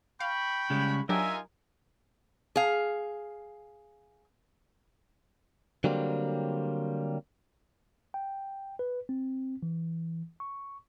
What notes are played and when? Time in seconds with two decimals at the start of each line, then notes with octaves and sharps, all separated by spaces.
0.20 F5 G5 B5 C#6
0.70 C#3 G3 G#3
1.09 F#3 D4 D#4 F4 G4 A#4 E5 G#5
2.56 G#4 F5
5.84 D3 F#3 G3 A#3 C4
8.14 G5
8.79 B4
9.09 C4
9.63 E3
10.40 C#6